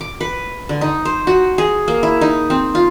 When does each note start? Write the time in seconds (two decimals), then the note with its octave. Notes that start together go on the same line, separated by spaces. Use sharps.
0.01 D6
0.21 B4
0.69 D3
0.81 D#4
1.05 C5
1.27 F#4
1.58 G#4
1.88 A#3
2.03 E4
2.21 D#4
2.50 C4
2.75 F4